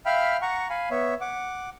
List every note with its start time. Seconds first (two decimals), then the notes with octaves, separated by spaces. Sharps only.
0.06 E5 F5 G5 B5 F6
0.42 F#5 A#5 C#6
0.70 F5 G#5 B5
0.91 B3 C#5 E5
1.21 F#5 D6